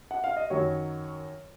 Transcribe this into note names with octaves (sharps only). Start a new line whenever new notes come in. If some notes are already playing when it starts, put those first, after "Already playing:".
F#5
F5
D#5
F#2 D#3 F#3 C#5